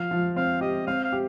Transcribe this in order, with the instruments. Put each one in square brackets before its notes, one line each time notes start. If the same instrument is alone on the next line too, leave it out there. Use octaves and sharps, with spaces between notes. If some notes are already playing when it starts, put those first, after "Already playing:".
Already playing: [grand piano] F3 [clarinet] F5
[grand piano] F3
[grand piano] C4 [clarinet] F5
[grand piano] G4 [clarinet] D#5
[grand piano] C4 [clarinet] F5
[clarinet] F5
[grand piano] G4